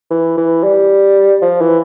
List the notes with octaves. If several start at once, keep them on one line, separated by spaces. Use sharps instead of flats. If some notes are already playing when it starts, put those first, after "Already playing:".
E3
E3
G3
F3
E3